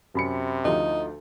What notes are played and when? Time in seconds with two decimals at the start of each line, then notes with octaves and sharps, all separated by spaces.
0.15 F#2 C3 B5 C#7
0.65 D2 F3 D#4